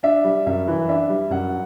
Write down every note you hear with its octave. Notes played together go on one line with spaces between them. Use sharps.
D4 E5
G3
F#2 E5
E3
D4 E5
G3
F#2 F#5